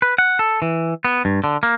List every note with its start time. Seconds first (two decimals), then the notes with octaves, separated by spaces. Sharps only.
0.02 B4
0.18 F#5
0.39 A4
0.62 E3
1.05 B3
1.25 G2
1.44 D3
1.63 A#3